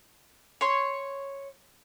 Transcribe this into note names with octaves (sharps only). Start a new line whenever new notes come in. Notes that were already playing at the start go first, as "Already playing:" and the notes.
C#5 C6